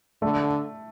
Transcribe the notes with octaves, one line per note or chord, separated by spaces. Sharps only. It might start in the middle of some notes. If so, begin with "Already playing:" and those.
D3 A3